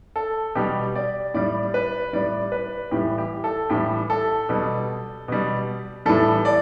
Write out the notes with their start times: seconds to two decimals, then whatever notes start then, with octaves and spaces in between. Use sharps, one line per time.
0.16 A4
0.55 B2 G3 G4
0.95 D5
1.34 A2 G3 D5
1.74 B4
2.13 A2 G3 D5
2.52 B4
2.91 A2 E3 G3 G4
3.18 G4
3.44 A4
3.70 A2 E3 G3 G4
4.10 A4
4.49 B2 G3
5.28 B2 G3
6.06 A2 E3 G3 A4
6.45 D5